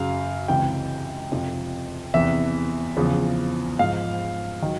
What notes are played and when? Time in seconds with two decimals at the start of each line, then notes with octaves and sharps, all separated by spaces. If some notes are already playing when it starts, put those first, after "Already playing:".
Already playing: F#2 C#3 F#3 F5
0.48 C#2 C3 E3 G5
1.32 F2 C3 F3
2.14 E2 C3 E3 E5
2.97 E2 C#3 F3
3.79 G#2 F3 F5
4.62 D#3 F#3